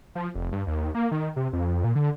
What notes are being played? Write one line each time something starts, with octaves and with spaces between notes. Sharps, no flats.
F3
F1
G2
D#2
A#3
D#3
C3
F2
A#2
D3